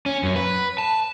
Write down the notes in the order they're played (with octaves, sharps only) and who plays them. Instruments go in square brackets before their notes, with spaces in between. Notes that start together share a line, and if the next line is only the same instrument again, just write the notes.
[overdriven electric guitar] C#4
F#2
B4
A5